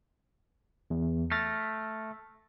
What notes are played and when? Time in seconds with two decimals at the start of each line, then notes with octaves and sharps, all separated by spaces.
0.90 E2
1.32 A3 F6 A6 A#6